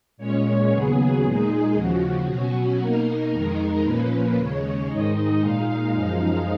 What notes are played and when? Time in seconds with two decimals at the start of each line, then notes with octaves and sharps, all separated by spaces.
0.18 A#2 G#3 C#4 C#5
0.70 D#2 C#3 F#3 B3 G#4
1.23 A#2 G#3 D#4
1.74 D#2 C#3 F3 F#4
2.27 B2 F#3 C#4
2.79 B2 A#3 D#4 A#4
3.32 F2 D#3 G#3 D#4
3.83 A#2 F3 A#3 C#4 B4
4.36 D#2 C#3 G#3 C#5
4.88 G#2 D#3 G#3 D#4 D#5
5.41 A#2 G#3 D#4 F5
5.93 F#2 F3 G#3 D#4